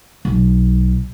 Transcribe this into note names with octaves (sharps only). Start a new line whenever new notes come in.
B1